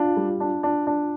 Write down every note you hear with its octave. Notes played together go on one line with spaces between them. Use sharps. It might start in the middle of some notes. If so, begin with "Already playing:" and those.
Already playing: D4 F4
G3
D4
D4
D4